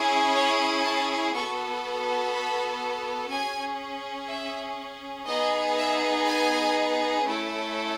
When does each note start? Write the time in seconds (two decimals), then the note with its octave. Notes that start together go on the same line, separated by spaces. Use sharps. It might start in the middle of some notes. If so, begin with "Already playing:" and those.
Already playing: C#4 E4 G#4
0.34 C#5
0.83 A5
1.33 B3 F#4 A4 C#6
2.31 B5
3.29 C#4 G#4 G#5
4.28 E5
5.27 B3 D#4 G#4 D#5
5.77 E5
6.26 G#5
7.24 A3 C#4 E4 A4